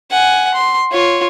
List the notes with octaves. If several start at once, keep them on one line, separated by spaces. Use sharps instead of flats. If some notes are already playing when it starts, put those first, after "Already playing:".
F#5 G#5
C6
F4 C#5